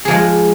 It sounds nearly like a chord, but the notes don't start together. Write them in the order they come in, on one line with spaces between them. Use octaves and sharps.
G#4 F3 G#3